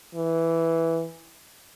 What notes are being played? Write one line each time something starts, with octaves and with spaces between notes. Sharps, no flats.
E3